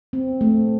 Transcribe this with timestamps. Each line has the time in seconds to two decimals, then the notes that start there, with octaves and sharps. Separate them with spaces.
0.13 C4
0.41 A3